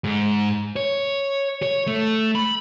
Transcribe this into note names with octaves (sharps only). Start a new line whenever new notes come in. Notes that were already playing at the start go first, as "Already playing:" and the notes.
G#2
C#5
C#5
A3
B5